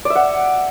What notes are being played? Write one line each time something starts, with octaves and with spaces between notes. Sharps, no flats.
D5
E5
F#5